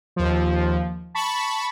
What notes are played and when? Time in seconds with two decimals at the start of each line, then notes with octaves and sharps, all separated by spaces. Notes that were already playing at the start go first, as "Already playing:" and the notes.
0.16 D#2 F3
1.15 A5 B5 C#6